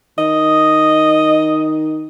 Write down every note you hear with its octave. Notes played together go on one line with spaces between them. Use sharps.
D#3 D#5